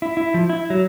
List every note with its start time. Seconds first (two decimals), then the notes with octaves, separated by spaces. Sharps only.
0.02 E4
0.17 E4
0.34 F3
0.50 E4
0.70 F#3